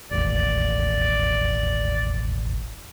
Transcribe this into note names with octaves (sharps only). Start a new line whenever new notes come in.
E1 A1 D#2 D5